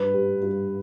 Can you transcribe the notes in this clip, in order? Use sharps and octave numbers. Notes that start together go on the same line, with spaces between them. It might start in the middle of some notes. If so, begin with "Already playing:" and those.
Already playing: G2 B4
G3
G2